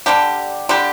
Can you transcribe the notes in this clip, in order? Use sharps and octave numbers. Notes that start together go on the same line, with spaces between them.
D3 G3 D4 G4
D3 G3 D4 G4